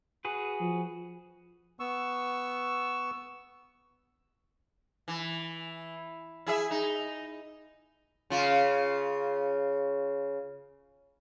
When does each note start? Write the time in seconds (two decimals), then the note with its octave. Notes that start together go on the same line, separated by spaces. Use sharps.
0.25 F#4 G#4 B4
0.60 F3
1.80 B3 C#6 E6
5.08 E3
6.47 E4 G#4 E5
6.71 D#4
8.30 C#3 F4